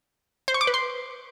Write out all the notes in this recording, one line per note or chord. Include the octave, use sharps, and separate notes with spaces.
C5
C#6
D6
B4
C6